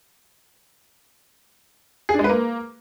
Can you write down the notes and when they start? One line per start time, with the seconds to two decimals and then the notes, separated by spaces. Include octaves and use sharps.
2.09 G#4
2.14 D4
2.19 G#3
2.24 B4
2.29 A#3